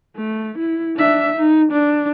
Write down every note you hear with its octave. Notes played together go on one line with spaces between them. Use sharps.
A3
E4
D4 E5
D#4
D4